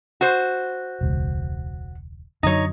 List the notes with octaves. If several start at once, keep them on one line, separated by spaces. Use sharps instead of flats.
F#4 C5
E1 C#2
F#2 D3 F#3 D#4 C#5